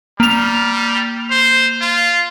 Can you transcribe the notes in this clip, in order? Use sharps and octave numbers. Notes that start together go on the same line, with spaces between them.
G3 A#3 F7
C5
F4